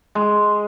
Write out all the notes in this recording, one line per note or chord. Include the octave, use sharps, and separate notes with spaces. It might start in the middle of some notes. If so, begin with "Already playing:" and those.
G#3